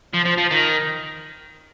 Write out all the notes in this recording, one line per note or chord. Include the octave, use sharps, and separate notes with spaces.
F3
F3
F3
D#3